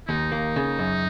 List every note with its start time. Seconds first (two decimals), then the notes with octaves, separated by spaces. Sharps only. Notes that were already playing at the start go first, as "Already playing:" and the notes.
0.08 D#2 D#4
0.32 A#3
0.56 C#3
0.79 F#2